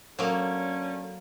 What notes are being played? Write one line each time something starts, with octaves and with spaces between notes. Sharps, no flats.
D3 F#3 A#3 C#4